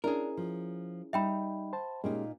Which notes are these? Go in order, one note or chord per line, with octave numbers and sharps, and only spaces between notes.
C#4 D4 E4 G#4 A#4
F3
G3 D#4 E5 G5 B5
C5 A5
A#2 G#3 A#3 C#4 D#4 G4